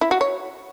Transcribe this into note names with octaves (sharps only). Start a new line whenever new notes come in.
E4
F#4
C#5